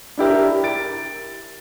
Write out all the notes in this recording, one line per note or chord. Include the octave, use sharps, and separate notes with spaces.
D4 E4 G4 A#4
A6 D7